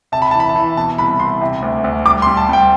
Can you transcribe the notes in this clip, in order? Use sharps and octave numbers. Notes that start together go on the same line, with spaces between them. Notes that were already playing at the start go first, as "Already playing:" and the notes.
C3 A5
B5
E3 A5
B5
A5
E3
B2 A5
C2 B5
C2 C6
C3
D2
D2
G3 D6
C6
G3
A5
G3 G5